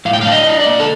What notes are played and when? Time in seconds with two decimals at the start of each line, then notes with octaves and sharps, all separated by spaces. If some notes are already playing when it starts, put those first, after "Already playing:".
0.05 A2 F5
0.13 G5
0.21 D4 F5
0.32 D#5
0.47 D4
0.60 D5
0.66 A#3
0.80 A4